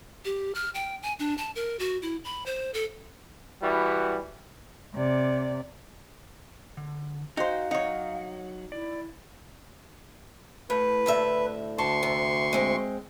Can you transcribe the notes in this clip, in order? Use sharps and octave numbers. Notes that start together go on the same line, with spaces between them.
G4
F6
G5
G#5
D4
A5
A#4
F#4
E4
B5
C5
A4
E3 G3 F#4
C3 D5
D3
D#4 F#4 C5 F5 G5
F#3 D#4 C#5 F#5
E4 D5
A2 B4
D2 A2 E5
D2 A5 C6 C#6
C3
G#3 C4